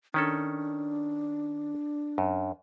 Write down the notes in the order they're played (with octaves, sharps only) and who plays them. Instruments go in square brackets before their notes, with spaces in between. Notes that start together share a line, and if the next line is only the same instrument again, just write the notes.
[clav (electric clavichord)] D#3 C#4 A4 [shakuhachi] D4
[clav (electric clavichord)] F#2